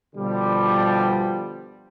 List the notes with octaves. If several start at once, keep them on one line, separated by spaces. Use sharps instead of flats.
B2 D3 F3 G3